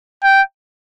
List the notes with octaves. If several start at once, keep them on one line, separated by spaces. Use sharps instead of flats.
G5